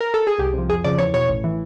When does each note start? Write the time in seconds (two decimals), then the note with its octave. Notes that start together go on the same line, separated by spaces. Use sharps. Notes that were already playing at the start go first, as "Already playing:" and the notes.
0.01 A#4
0.14 A4
0.27 G#4
0.39 C2 G4
0.54 C3 F3
0.69 F2 G#4
0.84 C#3 F3 D5
0.98 E2 C#5
1.14 B2 C#5
1.29 A1
1.44 E3